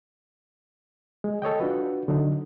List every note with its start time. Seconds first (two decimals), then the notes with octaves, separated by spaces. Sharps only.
1.24 G#3
1.42 A4 C#5 D#5 G5
1.60 D4 F4 F#4 B4
2.08 D3 F#3 D4 D#4